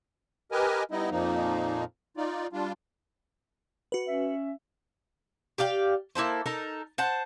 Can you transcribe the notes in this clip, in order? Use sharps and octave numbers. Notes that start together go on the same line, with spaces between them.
G4 A#4 B4 D#5 G#5
G3 B3 D#4 E4 D#5
F2 A#2 F3 A#3 D#4
D#4 F4 D5
G3 D4 F4
F#4 B4
C#4 E5
G4 D5 F5 G5
A#3 E4 A4 C5
D#4 A4 A#4
C5 F#5 A5